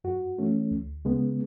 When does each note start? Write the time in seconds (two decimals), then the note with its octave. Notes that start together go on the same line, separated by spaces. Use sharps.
0.04 F#2 F#4
0.38 E3 A3 C#4
0.71 D2
1.05 C#3 G#3 B3